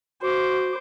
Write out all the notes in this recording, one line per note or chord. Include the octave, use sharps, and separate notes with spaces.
F#4 C5 D6